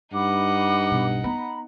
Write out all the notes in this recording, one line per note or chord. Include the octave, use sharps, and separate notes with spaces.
G2 D#4 F#5 B5 D6
B1 B2
B3 A#5 B5